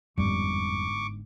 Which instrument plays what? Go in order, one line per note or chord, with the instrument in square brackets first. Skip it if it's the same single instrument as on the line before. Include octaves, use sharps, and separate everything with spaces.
[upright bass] G1 G#2 [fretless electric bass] F2 G3 [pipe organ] C#6 D6